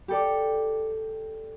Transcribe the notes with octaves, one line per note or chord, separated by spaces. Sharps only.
G4 A4 D5